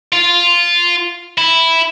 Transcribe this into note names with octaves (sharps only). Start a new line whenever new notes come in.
F4
E4